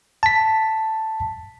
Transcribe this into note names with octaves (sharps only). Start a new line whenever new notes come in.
A5 B6